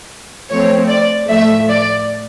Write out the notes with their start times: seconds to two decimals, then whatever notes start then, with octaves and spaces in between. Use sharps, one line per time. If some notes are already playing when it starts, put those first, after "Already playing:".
0.50 F3 A3 C4 C#5
0.89 D5
1.29 A2 F3 A3 E5
1.68 D5